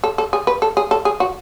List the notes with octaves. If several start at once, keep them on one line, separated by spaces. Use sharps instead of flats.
A4
A4
G#4
B4
A4
G#4
A4
G#4
F#4